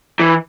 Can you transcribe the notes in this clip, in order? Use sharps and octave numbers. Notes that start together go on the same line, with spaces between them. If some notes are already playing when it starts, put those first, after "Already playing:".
E3